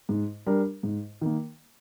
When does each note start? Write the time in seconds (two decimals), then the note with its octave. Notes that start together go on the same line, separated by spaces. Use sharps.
0.09 G#2
0.46 G3 D4 G4 A#4
0.83 G#2
1.21 D#3 A#3